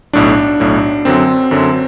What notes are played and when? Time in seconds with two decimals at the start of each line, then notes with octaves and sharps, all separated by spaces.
0.13 B1 A2 F#3 D4
0.60 B1 A2 F#3
1.05 F#2 D3 F#3 C4
1.51 F#2 D3 F#3